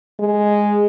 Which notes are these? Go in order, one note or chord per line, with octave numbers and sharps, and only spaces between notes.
G#3